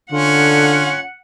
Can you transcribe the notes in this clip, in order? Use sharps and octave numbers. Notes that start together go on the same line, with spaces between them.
D3 C#4 F4 F#5